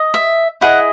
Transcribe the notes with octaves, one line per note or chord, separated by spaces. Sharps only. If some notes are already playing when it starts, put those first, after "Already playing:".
Already playing: D#5
E5
E4 G#4 D#5 F#5